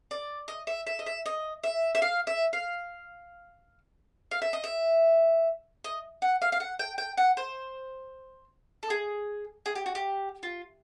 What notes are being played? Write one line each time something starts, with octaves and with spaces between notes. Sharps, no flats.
D5
D#5
E5
E5
D#5
E5
D#5
E5
E5
F5
E5
F5
F5
E5
D#5
E5
D#5
F#5
F5
F5
F#5
G5
G5
F#5
C5
A4
G#4
G#4
G4
F#4
G4
F4